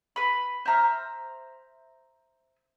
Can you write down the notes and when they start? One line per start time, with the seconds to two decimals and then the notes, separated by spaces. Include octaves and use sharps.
0.16 B4 B5
0.65 C5 E5 A#5 F6